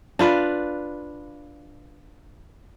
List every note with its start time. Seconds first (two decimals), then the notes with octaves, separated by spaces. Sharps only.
0.19 D4 F4 B4